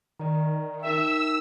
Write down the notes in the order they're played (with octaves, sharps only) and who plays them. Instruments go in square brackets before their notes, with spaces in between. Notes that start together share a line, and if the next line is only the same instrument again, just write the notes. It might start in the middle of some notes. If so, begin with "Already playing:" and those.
[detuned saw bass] D#3 [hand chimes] D5 A#5
[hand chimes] D#4 A#4 G5 [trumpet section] E5 [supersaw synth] E6